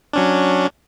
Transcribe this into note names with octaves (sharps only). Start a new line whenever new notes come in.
F#3 C#4 D4